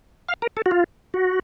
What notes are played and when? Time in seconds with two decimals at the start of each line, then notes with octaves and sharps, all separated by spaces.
0.29 F5
0.42 A#4
0.57 A4
0.66 F#4
0.71 F4
1.14 F#4